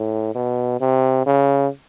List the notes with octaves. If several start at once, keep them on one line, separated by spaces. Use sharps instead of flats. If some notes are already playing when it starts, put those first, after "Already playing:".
Already playing: A2
B2
C3
C#3